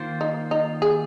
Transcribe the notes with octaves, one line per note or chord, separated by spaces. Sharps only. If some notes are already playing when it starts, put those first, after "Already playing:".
Already playing: D#3 A#3 F4 C5
D#4
D#4
G#4